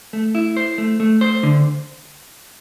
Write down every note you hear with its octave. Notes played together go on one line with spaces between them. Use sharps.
A3
E4
C5
A3
A3
C5
D3